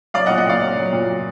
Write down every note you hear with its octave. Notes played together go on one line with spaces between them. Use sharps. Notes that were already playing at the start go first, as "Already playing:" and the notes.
F#3 D5 F5
D#5 F#5
A#2
D#5 F#5
A#2 D5 F5
F#3
F#3
A#2